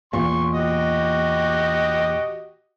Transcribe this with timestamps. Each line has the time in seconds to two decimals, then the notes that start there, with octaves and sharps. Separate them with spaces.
0.13 E2 A#2 C6 C#6
0.54 F#4 G4 D#5